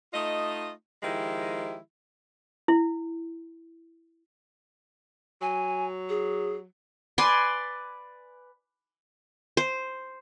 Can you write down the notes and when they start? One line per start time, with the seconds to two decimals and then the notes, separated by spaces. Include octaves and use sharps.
0.13 A3 D#4 F4 D#5
1.03 D#3 F3 G#3 E4 G4
2.68 E4
5.41 F#3 G#5
6.09 G#4
7.18 B4 D5 G#5 C6
9.57 C5